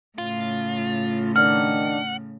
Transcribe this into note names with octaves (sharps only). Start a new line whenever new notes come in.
A2 C#3 F4
D#3 D4 F#5 F6